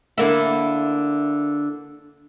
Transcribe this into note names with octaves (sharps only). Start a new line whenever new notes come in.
D3 A#3 E4